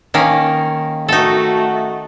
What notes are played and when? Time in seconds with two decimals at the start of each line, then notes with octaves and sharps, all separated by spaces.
0.14 D#3 A#3 C#4
1.08 A3 D#4 F#4 A4